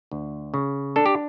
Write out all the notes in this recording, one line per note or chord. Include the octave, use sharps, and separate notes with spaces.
D2
C#3
D4 A4
G4